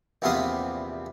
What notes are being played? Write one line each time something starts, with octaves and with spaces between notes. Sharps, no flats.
A#1 E2 C3 B3 F5 D#6